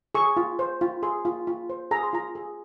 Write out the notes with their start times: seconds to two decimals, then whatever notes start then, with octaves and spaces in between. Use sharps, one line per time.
0.15 G#4 C#6
0.37 F4
0.59 C5
0.81 F4
1.03 G#4 C6
1.25 F4
1.47 F4
1.69 C5
1.91 G#4 A#5
2.03 C6
2.13 F4 A#5
2.35 G#4